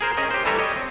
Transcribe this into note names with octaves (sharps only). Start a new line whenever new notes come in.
G#4 A#4 C5
C#4 G#4 A#4 D#5
G4 C5
E3 G3 A3 A4 G#5 A#5
G4 C#5 D#5
C4